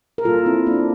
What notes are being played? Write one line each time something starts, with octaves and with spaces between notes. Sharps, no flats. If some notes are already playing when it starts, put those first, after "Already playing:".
A#4
A#2 G3 A#3 F4 A4
C4 E4
A#3 D4